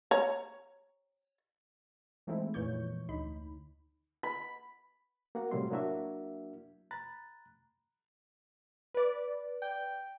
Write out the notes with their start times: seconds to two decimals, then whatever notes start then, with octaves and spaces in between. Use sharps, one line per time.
0.11 C#5 A#5
2.27 E3 G#3 A3 C4 D#4 E4
2.54 F2 A#2 E3 C#5 C#6 G6
3.09 D2 D#4 B5
4.23 B5
5.35 A#3 F#4 F#5
5.51 A2 C3 F#3 G3 E4 C6
5.70 F#3 A#3 D4 E4 F#4 E5
6.91 A#5 B5 F#6 A6
8.94 B4 D5
9.62 G5